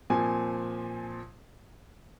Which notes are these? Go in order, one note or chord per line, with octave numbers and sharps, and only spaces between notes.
A#2 F3 C4 G#5